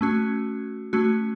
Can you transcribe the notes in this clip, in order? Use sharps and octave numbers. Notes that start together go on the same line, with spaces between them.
A3 C#4 F#4
A3 C#4 F#4